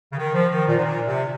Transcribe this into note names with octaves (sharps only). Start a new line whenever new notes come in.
C#3
D#3
F3
D#3
A#2
G#2
A#2
C3